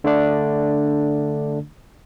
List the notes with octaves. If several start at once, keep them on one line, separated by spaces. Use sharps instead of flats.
D3 A3 D4